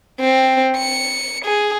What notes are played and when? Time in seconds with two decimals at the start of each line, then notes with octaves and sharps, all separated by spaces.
0.20 C4
0.76 C#7
1.45 G#4